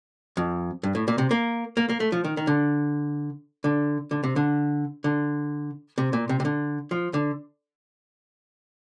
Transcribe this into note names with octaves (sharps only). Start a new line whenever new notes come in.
F2
G2
A2
A#2
C3
A#3
A#3
A#3
A3
F3
D#3
D#3
D3
D3
D3
C3
D3
D3
C3
A#2
C3
C3
D3
F3
D3